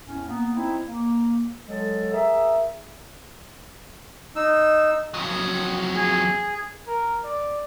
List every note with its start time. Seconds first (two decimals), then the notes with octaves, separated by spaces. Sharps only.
0.03 E2 A2 C#4
0.28 A#3 B3
0.55 C4 D#4 E4
0.86 A#3
1.66 F#3 G#3 A4
2.13 G#4 A#4 E5
4.36 D#4 E6
5.14 F2 F#3 D#6
5.95 G#4
6.87 A#4
7.24 D5